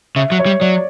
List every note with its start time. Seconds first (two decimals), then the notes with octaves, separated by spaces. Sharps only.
0.16 C#3 E5
0.32 F#3
0.39 C#5
0.46 G3
0.61 F#3 D5